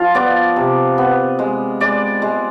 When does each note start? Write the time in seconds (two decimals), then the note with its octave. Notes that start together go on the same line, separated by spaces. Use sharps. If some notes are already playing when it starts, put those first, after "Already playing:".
Already playing: F3 F4
0.14 B3 D5
0.56 C3
0.98 B3
1.39 G#3
1.80 G#3 D5
2.22 G#3